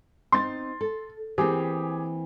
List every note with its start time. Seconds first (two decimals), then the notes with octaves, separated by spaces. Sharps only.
0.32 C4 D4 D#4 C6 A6
0.81 A4
1.38 E3 A#3 C4 G4 G#4